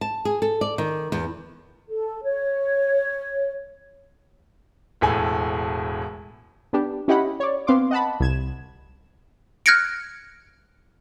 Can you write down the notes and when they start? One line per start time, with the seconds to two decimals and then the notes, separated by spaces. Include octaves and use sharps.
0.01 A5
0.25 G#4
0.42 A4
0.61 D5
0.78 D#3
1.12 E2
1.89 A4
2.23 C#5
5.01 E1 A2 A4 G#5
6.73 B3 D4 G4
7.08 C#4 E4 G4 D#5 F#5 B5
7.40 C#5 D5
7.67 B3 C4 F5 C6 D6
7.91 D#5 F#5 A5 B5
8.20 C2 G#6 E7
9.66 F6 F#6 G#6 A#6 C#7 D7